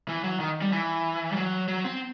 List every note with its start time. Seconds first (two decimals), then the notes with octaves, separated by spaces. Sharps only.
0.08 E3
0.24 F#3
0.40 D#3
0.62 G3
0.72 E3
1.32 G3
1.36 F#3
1.68 F#3
1.85 C4